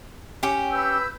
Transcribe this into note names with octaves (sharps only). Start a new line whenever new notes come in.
C#4 G4
B4 E6 G6